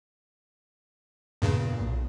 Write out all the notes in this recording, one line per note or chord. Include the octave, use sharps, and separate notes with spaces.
E2 G2 A#2 C#3
B1